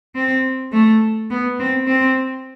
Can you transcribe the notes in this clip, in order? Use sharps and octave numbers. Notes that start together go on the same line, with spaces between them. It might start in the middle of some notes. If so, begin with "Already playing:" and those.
C4
A3
B3
C4
C4